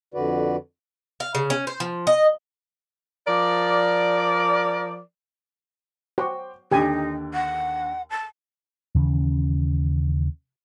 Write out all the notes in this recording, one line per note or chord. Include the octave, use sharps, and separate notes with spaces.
F2 D3 F#4 B4 D5
F5
C#3
C#4
C5
F3
D#5
F3 A#4 D5
F#4 C5 G5 D6
D#2 D3 D#4 G4 G#5
F#5
A5
D#2 C#3 E3 C#4